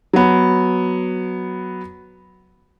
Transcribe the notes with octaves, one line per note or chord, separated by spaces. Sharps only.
F#3 B3